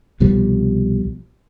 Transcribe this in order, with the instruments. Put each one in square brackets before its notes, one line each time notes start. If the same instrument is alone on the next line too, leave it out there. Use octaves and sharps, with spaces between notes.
[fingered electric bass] C2 B2 F3 G3